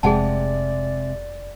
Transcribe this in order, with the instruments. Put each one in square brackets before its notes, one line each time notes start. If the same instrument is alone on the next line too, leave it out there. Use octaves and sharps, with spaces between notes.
[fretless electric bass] F1 [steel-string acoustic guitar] C3 G#3 [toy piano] G#4 F#5 A5 [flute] D5